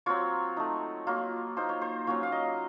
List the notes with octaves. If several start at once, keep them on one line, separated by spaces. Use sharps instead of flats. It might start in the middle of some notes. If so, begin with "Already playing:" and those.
F#3 C4 F4 C#5
A3 D#4
F#3 A#3 F4
A#3 D#4 C5
C#5
C5
F#3 A#3 C#4 F4 C#5
F5
D#5